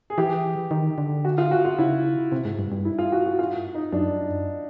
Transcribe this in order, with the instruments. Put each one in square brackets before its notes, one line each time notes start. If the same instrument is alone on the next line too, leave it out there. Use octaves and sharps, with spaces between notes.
[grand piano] G#4
[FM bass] E3 [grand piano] G4
[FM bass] D#3
D3
[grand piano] F#4
F4
F#4
F4
[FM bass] C#3 [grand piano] E4
[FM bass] C3
G#2
G2
G2
[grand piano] E4
F4
F#4
F#4
F4
D#4
[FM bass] F#2 [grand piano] D4